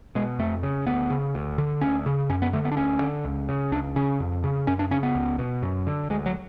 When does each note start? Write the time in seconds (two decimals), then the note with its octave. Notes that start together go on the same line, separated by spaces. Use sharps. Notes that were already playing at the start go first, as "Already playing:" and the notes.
0.15 B2 G#3
0.39 F2 A3
0.63 C#3
0.87 D2 B3
1.10 C#3
1.35 D2
1.58 D3
1.81 D2 C#4
2.06 C#3
2.30 F#2 C#4
2.42 B3
2.53 D3 A3
2.65 B3
2.72 D4
2.77 D2 C#4
3.01 D3
3.25 C#2
3.49 C#3
3.72 C#2 D4
3.96 C#3 C#4
4.20 F2
4.44 C#3
4.67 F#2 C#4
4.79 D4
4.91 C#3 C#4
5.03 B3
5.15 C#2
5.39 B2
5.63 F#2
5.87 D3
6.10 D2 G#3
6.26 F#3